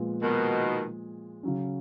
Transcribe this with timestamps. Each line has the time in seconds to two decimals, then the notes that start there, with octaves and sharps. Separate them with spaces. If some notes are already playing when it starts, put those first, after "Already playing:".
Already playing: A#2 F3 G#3 B3
0.22 B2 D#3
1.43 C#3 F#3 C#4